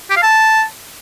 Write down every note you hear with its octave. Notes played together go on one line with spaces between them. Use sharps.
G4
F5
A5